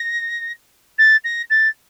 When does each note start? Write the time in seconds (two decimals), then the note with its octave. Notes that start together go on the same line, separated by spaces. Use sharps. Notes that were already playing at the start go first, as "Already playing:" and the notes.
Already playing: A#6
0.98 A6
1.24 A#6
1.50 A6